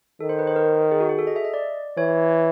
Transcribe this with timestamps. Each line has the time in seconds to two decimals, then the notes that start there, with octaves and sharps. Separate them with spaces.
0.20 D#3 A4
0.29 C5
0.39 B4
0.47 C5
0.56 A#4
0.92 G#4
1.00 F#4
1.09 G#4
1.18 A4
1.27 D#5
1.36 E5
1.45 D#5
1.54 D5
1.97 E3 C#5